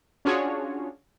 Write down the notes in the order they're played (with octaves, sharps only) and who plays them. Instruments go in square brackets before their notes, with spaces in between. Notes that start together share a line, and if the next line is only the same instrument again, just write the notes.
[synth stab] C#4 D4 F4 F#4 G#4 C#5